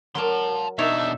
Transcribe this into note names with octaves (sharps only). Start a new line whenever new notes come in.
F#3 A#4 D5 A5 C6
B2 D4 D#4 C#5 D5 E5